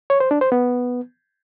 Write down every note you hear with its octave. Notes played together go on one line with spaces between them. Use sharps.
C#5
C5
D4
C5
B3